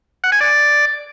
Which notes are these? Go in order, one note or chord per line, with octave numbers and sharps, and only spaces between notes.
F#5
G#5
D5